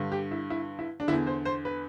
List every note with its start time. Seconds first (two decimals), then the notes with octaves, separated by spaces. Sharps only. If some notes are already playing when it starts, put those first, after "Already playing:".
Already playing: G2 D3
0.12 G4
0.31 E4
0.50 E4
0.79 E4
1.00 D4
1.08 D3 E4
1.12 E2
1.27 C5
1.45 C5
1.65 B4